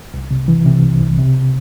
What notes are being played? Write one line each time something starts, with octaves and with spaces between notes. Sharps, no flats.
C2
C3
E3
C3
C2
C2
C3